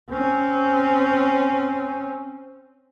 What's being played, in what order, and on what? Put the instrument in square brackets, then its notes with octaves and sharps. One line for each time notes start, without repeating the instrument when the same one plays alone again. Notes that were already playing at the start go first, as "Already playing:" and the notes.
[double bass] C4 C#4